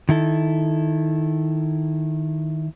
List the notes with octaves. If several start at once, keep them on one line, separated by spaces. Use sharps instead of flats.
D#3 E4 A4